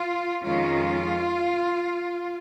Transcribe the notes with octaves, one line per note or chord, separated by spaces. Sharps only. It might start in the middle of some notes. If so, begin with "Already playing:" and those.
Already playing: F4
F2 D#3 G#3 C#4 F4